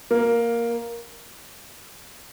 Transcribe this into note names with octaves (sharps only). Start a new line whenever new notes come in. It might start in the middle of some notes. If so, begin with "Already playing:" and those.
A#3